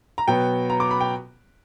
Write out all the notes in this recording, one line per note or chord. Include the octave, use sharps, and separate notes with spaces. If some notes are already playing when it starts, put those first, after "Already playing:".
A#5
B2 F#3 B3 G5
A#5
D6
B5
G5